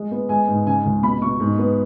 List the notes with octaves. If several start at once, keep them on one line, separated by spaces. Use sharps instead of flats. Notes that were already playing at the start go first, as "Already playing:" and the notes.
Already playing: G#3
B3
G#3 G#5
G#2
C#3 G#5
C#2
B2 B5
B2 C#6
G#2
B3